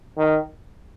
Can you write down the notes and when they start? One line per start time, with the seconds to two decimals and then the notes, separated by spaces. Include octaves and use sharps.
0.18 D#3